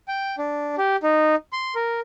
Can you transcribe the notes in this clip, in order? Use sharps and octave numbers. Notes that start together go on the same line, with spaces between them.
G5
D4
G4
D#4
C6
A#4